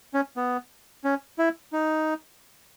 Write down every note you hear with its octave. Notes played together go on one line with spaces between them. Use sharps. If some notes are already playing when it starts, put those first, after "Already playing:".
C#4
B3
C#4
E4
D#4